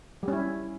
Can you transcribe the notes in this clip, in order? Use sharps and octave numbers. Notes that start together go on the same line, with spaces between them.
G3 C#4 E4